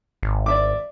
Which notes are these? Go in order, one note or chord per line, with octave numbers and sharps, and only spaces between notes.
G#1
D5 E5 D6